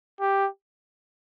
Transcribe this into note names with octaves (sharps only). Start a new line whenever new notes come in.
G4